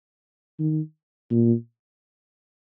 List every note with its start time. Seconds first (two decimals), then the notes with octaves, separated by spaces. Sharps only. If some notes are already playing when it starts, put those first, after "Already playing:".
0.59 D#3
1.31 A#2